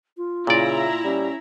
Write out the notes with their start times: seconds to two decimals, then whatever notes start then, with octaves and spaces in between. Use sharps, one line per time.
0.17 F4
0.47 A#2 C#3 E4 D5 E5 A#5
1.04 G3 C#4